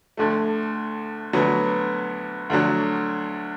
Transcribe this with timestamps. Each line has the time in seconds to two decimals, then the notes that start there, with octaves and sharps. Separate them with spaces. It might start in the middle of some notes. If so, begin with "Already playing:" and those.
0.17 D2 D3 A3
1.33 D2 D3 F#3 B3
2.50 D2 D3 F#3 D4